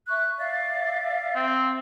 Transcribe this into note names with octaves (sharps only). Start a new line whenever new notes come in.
E5 C#6 F#6
D5 E5 F5
C4